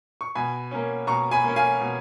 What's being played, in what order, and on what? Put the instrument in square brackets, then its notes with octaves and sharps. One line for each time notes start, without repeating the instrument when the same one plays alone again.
[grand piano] C#6
B2 G#5 B5
A#3 C#4
B2 A#5 C#6
G#5 B5
A#3 C#4
F5 G#5
B2